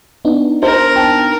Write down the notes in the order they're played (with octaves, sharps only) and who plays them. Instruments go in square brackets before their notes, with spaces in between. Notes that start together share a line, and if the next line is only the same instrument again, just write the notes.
[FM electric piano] B3 D4 D#4
[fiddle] A#4 [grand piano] C5
[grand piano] G5 A5